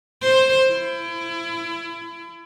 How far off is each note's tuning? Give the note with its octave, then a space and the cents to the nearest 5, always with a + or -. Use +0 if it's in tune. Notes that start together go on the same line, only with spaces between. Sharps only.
C5 +10
E4 +35